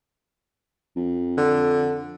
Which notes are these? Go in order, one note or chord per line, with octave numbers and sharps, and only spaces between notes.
F2
D3